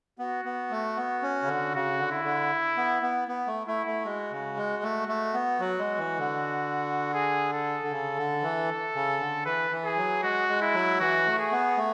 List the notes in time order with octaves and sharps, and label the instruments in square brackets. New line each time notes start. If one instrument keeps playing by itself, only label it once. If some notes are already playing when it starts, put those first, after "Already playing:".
[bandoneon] B3 [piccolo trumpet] F#4
[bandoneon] B3
A3
B3
C#4
C#3
D3
[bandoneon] C#3 [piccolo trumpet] F#4
[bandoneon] D3
[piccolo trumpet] E4
[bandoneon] D3
B3
B3
B3
A3
[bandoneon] A3 [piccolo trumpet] E4
[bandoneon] A3
[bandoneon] G#3 [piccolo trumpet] F#4
[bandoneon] C#3
G#3
A3
A3
B3
[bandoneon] F#3 [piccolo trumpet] F#4
[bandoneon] G#3
E3
D3
[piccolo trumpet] G#4
A4
[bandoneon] D3
C#3
D3
E3
C#3
D3
[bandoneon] E3 [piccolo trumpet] B4
[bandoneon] E3
[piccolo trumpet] G#4
[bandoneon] F#3
[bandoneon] G#3 [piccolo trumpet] F#4
[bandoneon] G#3
[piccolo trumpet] E4
[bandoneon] F#3
[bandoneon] E3 [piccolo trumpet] F#4
[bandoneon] A3
[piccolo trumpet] G#4
[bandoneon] B3
A3